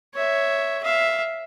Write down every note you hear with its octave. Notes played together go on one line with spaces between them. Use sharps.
C#5 E5
E5 F5